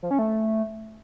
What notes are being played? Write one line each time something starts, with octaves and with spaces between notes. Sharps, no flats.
F3
C#4
A3